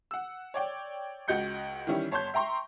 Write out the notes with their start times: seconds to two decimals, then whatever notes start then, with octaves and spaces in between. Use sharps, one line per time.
0.11 F#5 E6
0.54 C#5 D5 G5
1.28 C#2 F#4 D#5 G6 C#7
1.87 D#3 E3 G3 C#4 E4
2.11 G1 C#5 A5 C6 G6
2.34 E5 G5 A#5 C6 C#6